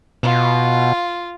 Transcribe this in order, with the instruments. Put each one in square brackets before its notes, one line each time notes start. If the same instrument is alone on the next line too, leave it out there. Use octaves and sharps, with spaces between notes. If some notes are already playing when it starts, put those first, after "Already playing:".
[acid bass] B2 [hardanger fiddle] F4